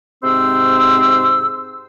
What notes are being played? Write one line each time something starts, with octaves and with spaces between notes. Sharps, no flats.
G#2 C3 C4 C5 C6 E6